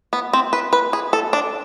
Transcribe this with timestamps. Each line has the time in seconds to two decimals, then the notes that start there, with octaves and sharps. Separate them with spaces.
0.13 B3
0.33 C4
0.53 B4
0.73 B4
0.93 G#4
1.13 A4
1.33 D4